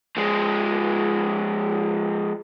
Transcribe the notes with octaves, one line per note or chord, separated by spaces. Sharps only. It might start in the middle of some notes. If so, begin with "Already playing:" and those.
F3 G#3